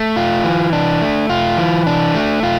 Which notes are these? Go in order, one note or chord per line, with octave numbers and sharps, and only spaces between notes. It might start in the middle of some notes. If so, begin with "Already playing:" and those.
Already playing: A3
F4
E3
D4
A3
F4
E3
D4
A3
F4